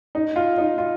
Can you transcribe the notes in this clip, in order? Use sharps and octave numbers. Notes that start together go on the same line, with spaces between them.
D#4
F4
D#4
F4